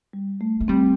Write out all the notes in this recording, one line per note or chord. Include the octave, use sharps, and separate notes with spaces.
G3
A3
A3
G3 C4